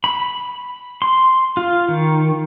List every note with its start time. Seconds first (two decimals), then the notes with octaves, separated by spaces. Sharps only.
0.04 B5
1.02 C6
1.57 F4
1.88 D#3